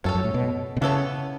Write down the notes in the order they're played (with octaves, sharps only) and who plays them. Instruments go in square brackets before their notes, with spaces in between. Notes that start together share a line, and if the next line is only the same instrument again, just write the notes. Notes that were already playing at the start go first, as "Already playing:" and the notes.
[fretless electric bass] F#2 [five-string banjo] C#4 A4 C#5
[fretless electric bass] F#2
A2
B2
B2
[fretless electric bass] C#3 [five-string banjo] E3 B3 A4 C#5